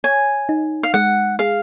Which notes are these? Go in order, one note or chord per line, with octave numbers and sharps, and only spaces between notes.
C#5 G#5
D#4
F5
G#3 F#5
G#4 F5